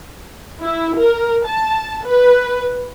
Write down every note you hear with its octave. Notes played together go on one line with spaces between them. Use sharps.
E4
A#4
A5
B4